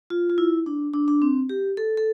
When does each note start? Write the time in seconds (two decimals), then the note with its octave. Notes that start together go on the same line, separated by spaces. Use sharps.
0.10 F4
0.30 F4
0.38 E4
0.66 D4
0.94 D4
1.08 D4
1.22 C4
1.49 G4
1.77 A4
1.97 A4